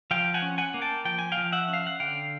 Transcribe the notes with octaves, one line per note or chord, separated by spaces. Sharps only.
F3 F5 G5
F#5 G#5
C#4
F#5 G#5
A#3
G5 A5
F3 G5
G#5
F5 G5
F3
E5 F#5
C#4
F5
F#5
D3 F5 G5